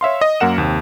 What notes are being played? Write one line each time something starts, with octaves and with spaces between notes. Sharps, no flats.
C#5 E5 F5 C6
D#5
F#2 A#3 A#4 F#5 E7
D#2 C3